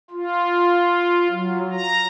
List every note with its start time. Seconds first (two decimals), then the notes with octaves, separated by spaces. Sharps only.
0.11 F4
1.28 F#3
1.71 A#5